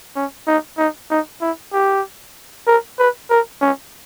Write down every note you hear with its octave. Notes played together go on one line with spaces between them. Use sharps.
C#4
D#4
D#4
D#4
E4
G4
A#4
B4
A#4
C#4